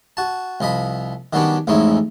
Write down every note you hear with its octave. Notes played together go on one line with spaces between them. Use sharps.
F#4 A5
C2 F3 D#5 B5
D#3 F#3 G3 B3 C#4 D4
A1 F2 G#3 C#4 D#4 E4